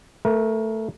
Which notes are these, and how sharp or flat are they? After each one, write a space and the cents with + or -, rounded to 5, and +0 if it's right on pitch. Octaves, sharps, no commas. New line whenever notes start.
A3 +5 A#4 +30